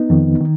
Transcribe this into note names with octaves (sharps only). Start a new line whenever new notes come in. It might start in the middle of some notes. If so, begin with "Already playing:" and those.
Already playing: B3 D#4
F2 D#3
D#3